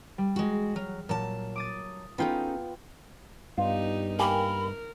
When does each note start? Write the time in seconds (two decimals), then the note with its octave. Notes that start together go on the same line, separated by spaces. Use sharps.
0.18 G3
0.36 G#3 F#4
0.76 F#3 F6
1.09 A#2 F#3 A5
1.56 D6 D#6 A6
2.18 B3 C#4 D#4 F4 A4 G5
3.58 G2 B3 D#4 F4 G4
4.19 A#3 G4 A#4 G#5 B5